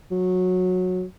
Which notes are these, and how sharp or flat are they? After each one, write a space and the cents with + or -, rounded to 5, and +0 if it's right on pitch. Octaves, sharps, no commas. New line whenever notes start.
F#3 -15